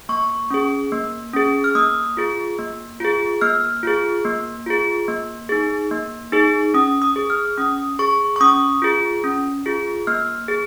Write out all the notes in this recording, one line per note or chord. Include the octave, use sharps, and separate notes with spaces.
A#3 C#6
C#4 G#4
A#3
C#4 G#4
F6
A#3 D#6
F4 G#4
A#3
F4 G#4
A#3 F6
F4 G#4
A#3
F4 G#4
A#3
D#4 G#4
A#3
D#4 G#4
C#4 D#6
D#6
G#4
F6
C#4 D#6
G#4 C#6
C#6
C#4 D#6
F4 G#4
C#4
F4 G#4
A#3 F6
G#4